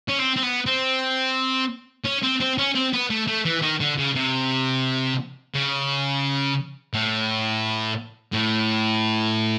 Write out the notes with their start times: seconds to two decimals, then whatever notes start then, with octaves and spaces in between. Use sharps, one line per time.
0.09 C#4
0.19 C4
0.36 C4
0.43 B3
0.66 C4
2.05 C#4
2.23 C4
2.40 C4
2.58 C#4
2.75 C4
2.93 B3
3.10 A3
3.28 A3
3.45 E3
3.62 D#3
3.80 D3
3.98 C#3
4.15 C3
5.54 C#3
6.94 A2
8.33 A2